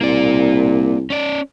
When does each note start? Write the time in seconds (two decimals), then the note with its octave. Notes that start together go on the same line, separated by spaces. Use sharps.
0.01 C2 A#3 D5
1.10 C#4 D5